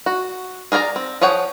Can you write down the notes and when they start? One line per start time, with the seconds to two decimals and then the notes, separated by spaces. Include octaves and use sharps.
0.06 F#4
0.72 G#4 A#4 D5 G5 A#5
0.96 C4
1.21 F3 G#4 C#5 F#5 G5